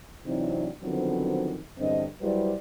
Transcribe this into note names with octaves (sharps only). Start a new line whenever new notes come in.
C3 E3 F#3 C4 D4 D#4
D3 D#3 F3 F#3 B3 C4
E2 G2 D3 C4 D#5
F#3 G3 E4 B4 C5 D5